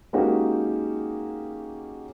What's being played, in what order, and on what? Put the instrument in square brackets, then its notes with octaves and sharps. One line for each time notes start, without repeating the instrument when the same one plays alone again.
[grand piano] G#3 A#3 C#4 D#4 F#4 G4